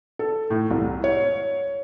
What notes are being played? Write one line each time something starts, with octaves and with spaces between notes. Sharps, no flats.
A4
A2
C2
C#5